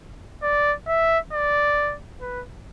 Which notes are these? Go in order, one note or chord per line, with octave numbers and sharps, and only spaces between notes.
D5
E5
D5
B4